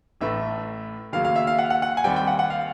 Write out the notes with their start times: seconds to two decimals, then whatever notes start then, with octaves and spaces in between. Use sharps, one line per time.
0.21 A1 A2 E3 A3 E5
1.13 D#2 C#3 F#3 A#3 F5
1.25 F5
1.36 E5
1.47 F5
1.59 F#5
1.70 F#5
1.82 F#5
1.97 G#5
2.04 D#2 D#3 G3 C4 G5
2.16 G5
2.27 F#5
2.39 F#5
2.50 F5